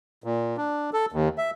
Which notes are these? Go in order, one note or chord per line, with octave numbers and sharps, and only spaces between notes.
A#2
D4
A4
D#2
E5